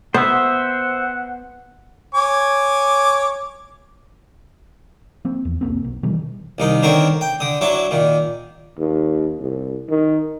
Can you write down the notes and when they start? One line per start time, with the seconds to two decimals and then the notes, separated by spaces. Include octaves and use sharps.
0.14 B3 C5 E5 F#5
2.14 C#5 G#5 D6
5.25 F3 A#3 C4
5.45 E2
5.61 F1 C2 A#3 C4
5.84 B1
6.03 B2 D#3 E3 G3
6.58 C2 D#3 D#4
6.83 D3 D#3 C4 A#4 C#5
7.21 G5
7.40 D3 D#6
7.61 F#3 D4 E4 C#5 D6
7.91 A#2 D#3
8.79 D#2
9.39 C2
9.89 D#3